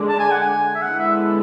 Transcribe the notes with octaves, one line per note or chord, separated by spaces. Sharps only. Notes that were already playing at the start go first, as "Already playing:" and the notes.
Already playing: D3 G#3 D4
A5
G#5
F#5
G#5
E5
D3 G#3 B3 E4 A4 F#5
E5